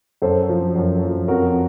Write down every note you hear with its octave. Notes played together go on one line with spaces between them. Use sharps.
F#2 A4 C5
F3
F#2
F3
F2 F#4 A#4